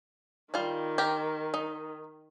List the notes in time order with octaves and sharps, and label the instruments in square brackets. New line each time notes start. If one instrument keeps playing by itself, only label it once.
[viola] D#3 [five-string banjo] G3 F4
[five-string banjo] G4 A#4 G5
D#4